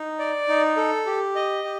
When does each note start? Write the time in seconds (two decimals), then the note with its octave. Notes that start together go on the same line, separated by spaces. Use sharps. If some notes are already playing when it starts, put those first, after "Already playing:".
Already playing: D#4
0.19 D5
0.48 D#4
0.77 A4
1.06 G4
1.36 D#5
1.64 G4